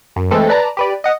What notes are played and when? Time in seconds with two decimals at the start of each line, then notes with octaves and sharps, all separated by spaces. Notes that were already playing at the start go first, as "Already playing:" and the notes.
0.16 F#2
0.31 E3 G#3 A3 C4 A4 B4
0.49 B4 D5 A5 A#5
0.77 G4 B4 D5
1.04 D#5 F#5 D#6